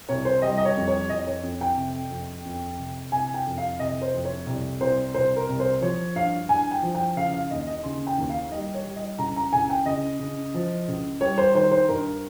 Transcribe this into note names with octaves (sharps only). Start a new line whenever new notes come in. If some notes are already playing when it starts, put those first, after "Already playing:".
C2 C#5
C5
G3 D#5
D#5
C#5
F2
C#5
F2 D#5
C#5
F2
G5
C3
F2
F2
C3
C3 G#5
G5
F2
F5
C3 D#5
C5
F2
C#5
C2
C2 C5
C2 C5
A#4
C2
C5
F3 C#5
G2 F5
G2 G#5
G5
F3
G5
C#3 F5
F5
D#2 D#5
D#5
C#3 C6
G5
D#2
F5
G3 D#5
C#5
G3
D#5
C#2 A#5
A#5
C#2 G#5
G5
C#3 D#5
C#3
F3
C#2
G3 C#5
C5
D#3 C5
C5
G2 A#4